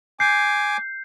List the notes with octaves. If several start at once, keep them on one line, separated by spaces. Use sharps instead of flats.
G#5 D6 G6 C7